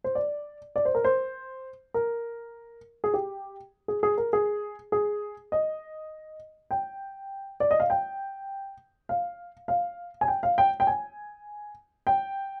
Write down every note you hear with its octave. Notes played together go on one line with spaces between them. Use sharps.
C5
D5
D5
C5
A#4
C5
A#4
G#4
G4
G#4
G#4
A#4
G#4
G#4
D#5
G5
D5
D#5
F5
G5
F5
F5
G#5
G5
F5
G5
G5
G#5
G5